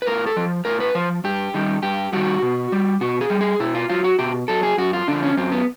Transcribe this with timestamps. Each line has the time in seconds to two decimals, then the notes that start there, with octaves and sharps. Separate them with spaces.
0.02 B4
0.07 A2 A#4
0.27 A4
0.36 F3
0.65 A2 A#4
0.80 B4
0.95 F3 C5
1.24 G2 G4
1.54 D#3 G3
1.83 G2 G4
2.13 D#3 G3 F#4
2.42 B2
2.72 G3
3.01 B2 F#4
3.21 G#4
3.30 G3
3.41 G#4
3.60 B2 E4
3.75 F4
3.89 F#3 F4
4.04 F#4
4.19 B2 G4
4.48 F#3 A4
4.63 G#4
4.78 F#2 F#4
4.93 F4
5.08 D3 F3 D4
5.23 C#4
5.37 F#2 C4
5.52 B3